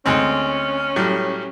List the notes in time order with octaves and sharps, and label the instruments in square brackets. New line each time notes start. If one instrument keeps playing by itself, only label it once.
[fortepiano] D2 G#3 C4 [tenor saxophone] C#4
[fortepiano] A2 F#3 G3